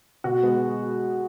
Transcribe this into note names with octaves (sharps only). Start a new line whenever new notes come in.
B2 F#4
G#3 B3